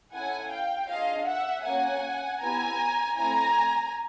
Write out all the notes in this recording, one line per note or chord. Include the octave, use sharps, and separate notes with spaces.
C#4 E4 A4 F#5 G#5
F5 G5
D4 F4 G#4 D#5 F5
E5 F#5
A#3 C#4 F#4 F#5 G#5
B3 E4 G4 G#5 A#5
A3 C4 E4 G#5 A#5